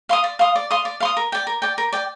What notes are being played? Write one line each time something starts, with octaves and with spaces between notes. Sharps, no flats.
F5 C6 D#6
D5
F5 C6 D#6
D5
F5 C6 D#6
D5
F5 C6 D#6
A#4
D5 G5
A#4
D5 G5
A#4
D5 G5